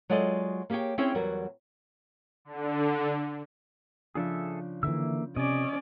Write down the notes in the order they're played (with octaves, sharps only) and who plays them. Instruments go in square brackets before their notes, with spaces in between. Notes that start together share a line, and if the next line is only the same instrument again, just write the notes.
[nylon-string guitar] F#3 G#3 F4 A4 D5 D#5
A#3 G4 G#4 C#5 G5
C4 C#4 E4 G#4 C#5 G5
E2 F#3 G3 F#4 A#4
[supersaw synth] D3
[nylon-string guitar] C#3 F3 D4 [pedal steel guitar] G#4 A4 E5
[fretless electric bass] D3 E3 [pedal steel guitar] A#3 E5 E6
[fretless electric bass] C3 [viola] C#4 D5 [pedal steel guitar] D#5